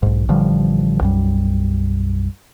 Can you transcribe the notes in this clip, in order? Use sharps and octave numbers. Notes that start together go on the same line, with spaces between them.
B1 G#2
A1 D3 F3 G3
B1 F#2 G3